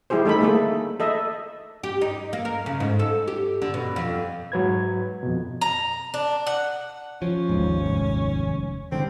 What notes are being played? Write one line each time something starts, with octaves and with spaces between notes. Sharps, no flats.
G3 E4 G4 G#4 C5
A3 D#4 A4 B5
A3 A#3 G#4 A4
A4 D#5 E5
G4
D#4
A#3
A#4
C#3
G#2
A4
G4
D3
B2
F2
G#2 F#3 B4 G#6
F2 B2
A#5
D4
F#5
F3 C#4
G#1 D#2 G#2
F1
D3 D#3 G3 C4